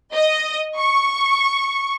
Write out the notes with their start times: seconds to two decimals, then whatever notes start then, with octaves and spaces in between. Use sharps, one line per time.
0.14 D#5
0.78 C#6